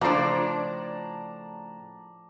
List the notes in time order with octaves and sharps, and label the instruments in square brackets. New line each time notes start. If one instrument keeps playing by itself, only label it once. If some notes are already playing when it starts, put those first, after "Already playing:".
[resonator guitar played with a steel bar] A2 C#3 D4 [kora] F3 C5 [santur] D5 A5 A#5